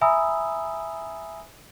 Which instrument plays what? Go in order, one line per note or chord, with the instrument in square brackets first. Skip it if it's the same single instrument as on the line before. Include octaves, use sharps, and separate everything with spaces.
[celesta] E5 G#5 A#5 B5 D#6 E6